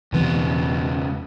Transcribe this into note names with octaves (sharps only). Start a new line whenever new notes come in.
E1 C#2 E3 B3 C4